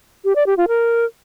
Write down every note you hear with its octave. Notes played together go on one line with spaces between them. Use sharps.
G4
D5
G4
F4
A#4